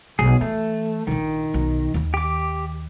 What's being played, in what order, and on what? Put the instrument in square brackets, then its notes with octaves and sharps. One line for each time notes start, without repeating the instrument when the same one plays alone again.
[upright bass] B1 [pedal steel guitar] G#4
[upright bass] E3 [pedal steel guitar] A3
[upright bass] A#1 A#2 [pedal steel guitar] D#3
[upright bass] B1
D#2 D#3
[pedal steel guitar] G4 D6